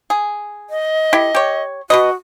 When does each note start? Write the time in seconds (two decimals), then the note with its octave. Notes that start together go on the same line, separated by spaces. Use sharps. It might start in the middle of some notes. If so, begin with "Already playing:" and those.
0.10 G#4
0.70 D#5
1.13 E4 G4 A4
1.35 G4 C#5
1.90 B2 F#4 B4 D#5